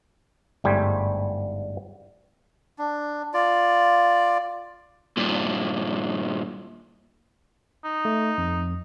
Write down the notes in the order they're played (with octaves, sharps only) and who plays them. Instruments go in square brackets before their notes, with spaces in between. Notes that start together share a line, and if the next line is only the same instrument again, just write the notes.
[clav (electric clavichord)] G1 G#2 G3 A3 C5 G#5
[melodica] D4
F4 D5
[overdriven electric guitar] G2 A#2
[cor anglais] D#4
[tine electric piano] A3
F2